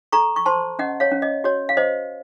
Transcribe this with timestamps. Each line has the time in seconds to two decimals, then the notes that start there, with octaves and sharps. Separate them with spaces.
0.12 A4 A#5 C#6
0.36 C#6
0.46 C5 A5 C6
0.79 C#4 D#5 F#5
1.00 C#5 F5
1.11 C#4
1.22 D#5
1.44 F#4 C#5
1.69 F5
1.77 C5 D#5